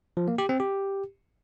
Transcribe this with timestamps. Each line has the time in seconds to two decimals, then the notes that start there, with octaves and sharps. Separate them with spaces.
0.17 F3
0.28 A#3
0.38 G4
0.49 C4
0.60 G4